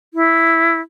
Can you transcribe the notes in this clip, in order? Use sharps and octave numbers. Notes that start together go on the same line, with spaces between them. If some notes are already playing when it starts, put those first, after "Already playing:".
E4